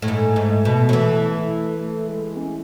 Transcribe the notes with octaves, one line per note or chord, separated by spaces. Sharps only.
A2
G#2 A3
G#2
B2
F#3
E3
A3
G#3
C#4